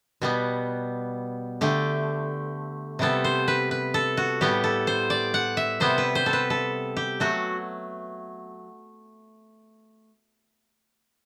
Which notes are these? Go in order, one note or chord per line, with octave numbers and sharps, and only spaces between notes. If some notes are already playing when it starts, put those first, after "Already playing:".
B2 G3 B3
D3 A3 G4
C3 G3 B3 A4
C5
B4
B4
A4
F#4
A2 G3 B3 G4
A4
C5
D5
F#5
E5
C3 G3 B3 C5
B4
C5
A4
B4
A4
G4
F#3 A3 F#4